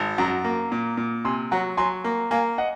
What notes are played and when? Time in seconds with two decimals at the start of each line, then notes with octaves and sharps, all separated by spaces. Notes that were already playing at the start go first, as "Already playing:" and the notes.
Already playing: G#1
0.18 F#2 F#5 A#5
0.44 A#3
0.72 A#2
0.97 A#2
1.25 C3 G#5 C6
1.51 F#3 F#5 A#5
1.77 F#3 G#5 C6
2.04 A#3
2.31 A#3 F5 G#5
2.58 D#5 F#5